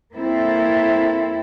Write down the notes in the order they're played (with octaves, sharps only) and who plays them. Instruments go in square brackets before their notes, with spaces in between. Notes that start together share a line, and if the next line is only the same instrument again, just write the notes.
[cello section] A#3 C4 E4 A4